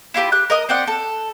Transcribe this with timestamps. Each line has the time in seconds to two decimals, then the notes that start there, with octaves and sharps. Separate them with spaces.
0.14 E4 F4 G4 B5
0.32 G4 F#6
0.50 A#4 D#5 D#6
0.69 C4 G4 D5 F#5
0.88 A4